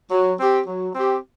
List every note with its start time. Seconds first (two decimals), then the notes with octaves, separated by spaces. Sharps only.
0.11 F#3
0.40 C4 G4
0.67 F#3
0.95 C4 G4